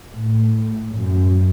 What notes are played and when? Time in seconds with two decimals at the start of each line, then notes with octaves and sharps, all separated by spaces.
0.15 A2
0.96 F#2